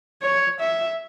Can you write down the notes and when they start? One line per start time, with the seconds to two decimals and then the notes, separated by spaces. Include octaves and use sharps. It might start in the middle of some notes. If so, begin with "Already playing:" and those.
0.22 C#5
0.60 E5